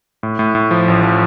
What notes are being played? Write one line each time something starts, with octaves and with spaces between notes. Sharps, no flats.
A2
A2
A2
F3
A1
F3